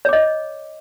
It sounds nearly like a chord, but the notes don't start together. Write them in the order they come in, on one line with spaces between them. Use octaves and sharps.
C#5 D6 D#5